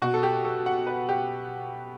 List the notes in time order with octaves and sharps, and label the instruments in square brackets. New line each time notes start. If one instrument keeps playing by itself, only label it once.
[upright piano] B2 F#4
A4
G4
A4
F#5
B4
G4